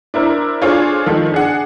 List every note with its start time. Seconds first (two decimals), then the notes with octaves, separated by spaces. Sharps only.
0.14 D4 E4 A#4 C5
0.61 D4 F4 G#4 A4 C5 C#5
1.06 D#3 F3 A4
1.32 D4 G#4 F#5